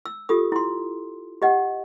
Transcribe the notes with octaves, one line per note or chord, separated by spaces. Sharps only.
E6
F4 G4 A4 D#6
E4 C6
G4 D#5 F#5